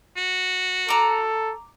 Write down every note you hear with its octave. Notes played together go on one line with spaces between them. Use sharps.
F#4
A4 A#5 D6